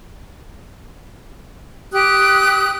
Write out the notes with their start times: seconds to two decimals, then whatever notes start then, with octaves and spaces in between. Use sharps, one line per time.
1.92 G4 D#6 F#6